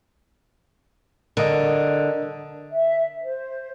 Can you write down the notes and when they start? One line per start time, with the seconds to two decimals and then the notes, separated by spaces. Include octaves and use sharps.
1.37 D3 A#4 D#5
2.70 E5
3.21 C5